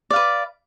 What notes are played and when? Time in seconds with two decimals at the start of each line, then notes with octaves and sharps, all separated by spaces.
0.11 D5
0.13 F5
0.16 B4